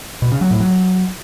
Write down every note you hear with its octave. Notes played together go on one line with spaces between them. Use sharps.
B2
C#3
F#3
A2
F#3